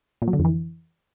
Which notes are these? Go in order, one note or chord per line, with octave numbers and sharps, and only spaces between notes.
A#2
F#3
D3
F2
E3